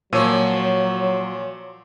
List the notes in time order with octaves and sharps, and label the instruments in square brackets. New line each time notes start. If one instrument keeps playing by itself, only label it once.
[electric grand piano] A#2 E6 D#7 [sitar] F3 C#5 [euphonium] F#3